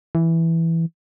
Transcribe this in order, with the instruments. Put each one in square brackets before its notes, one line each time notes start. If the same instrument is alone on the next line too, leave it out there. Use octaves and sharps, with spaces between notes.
[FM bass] E3